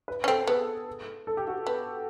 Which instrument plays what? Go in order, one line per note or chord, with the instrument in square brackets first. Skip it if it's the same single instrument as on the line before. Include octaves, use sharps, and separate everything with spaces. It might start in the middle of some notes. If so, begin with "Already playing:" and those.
[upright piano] B4
[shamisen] C#4
[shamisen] C4 [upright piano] A4
[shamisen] B3 [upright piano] G#4
[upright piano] A4
G4
F#4
[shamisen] B3